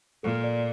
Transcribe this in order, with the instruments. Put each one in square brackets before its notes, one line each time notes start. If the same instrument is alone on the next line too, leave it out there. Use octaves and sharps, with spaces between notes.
[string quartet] A#2 [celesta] A4
[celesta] D5